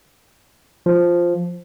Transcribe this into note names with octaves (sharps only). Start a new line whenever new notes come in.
F3